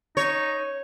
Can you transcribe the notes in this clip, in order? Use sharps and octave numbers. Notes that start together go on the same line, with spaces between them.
D#4 C#5